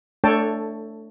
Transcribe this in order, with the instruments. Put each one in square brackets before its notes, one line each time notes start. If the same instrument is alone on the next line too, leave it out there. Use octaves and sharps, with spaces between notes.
[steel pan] A3 D4 A4 C#5 G5 A5